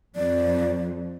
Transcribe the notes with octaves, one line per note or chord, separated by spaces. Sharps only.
F2 D5